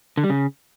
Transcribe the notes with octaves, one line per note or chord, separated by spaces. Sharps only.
D3
G3
C#3